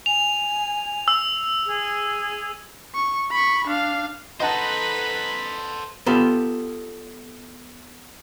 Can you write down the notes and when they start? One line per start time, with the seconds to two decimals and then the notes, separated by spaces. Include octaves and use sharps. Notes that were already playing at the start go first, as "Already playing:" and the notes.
0.06 G#5 F7
1.08 E6
1.66 G#4
2.95 C#6
3.31 B5 C#6
3.67 D4 F5
4.40 D#4 A4 B4 C5 D#5 F#5 A5 B5
6.06 B3 F4 G4 A4